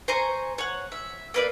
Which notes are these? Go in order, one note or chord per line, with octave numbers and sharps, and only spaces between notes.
C5 G#5 A#5 C#6
C#5 F#5
E5
A#3 B4 D5